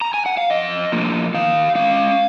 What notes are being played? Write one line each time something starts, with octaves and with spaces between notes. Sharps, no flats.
A#5
G#5
F#5
F5
F2 D#5
F3 A#3
D#3 F5
G#3 C#4 F5